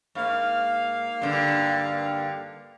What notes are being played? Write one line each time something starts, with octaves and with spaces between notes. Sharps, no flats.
G#2 A#3 F5
G2 D3